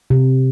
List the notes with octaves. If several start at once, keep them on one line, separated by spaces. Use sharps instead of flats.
C3